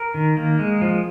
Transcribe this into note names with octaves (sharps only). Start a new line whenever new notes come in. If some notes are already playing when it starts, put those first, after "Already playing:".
Already playing: A#4
D#3
A#3
G#3
F3